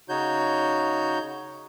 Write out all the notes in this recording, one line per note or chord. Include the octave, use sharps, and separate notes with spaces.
C#3 D#4 F#4 C#5 G6